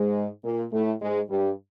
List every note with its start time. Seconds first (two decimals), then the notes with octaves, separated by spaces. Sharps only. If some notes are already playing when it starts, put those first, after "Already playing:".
Already playing: G#2 G#3
0.44 A#2 A#3
0.73 A2 A3
1.02 G#2 G#3
1.30 G2 G3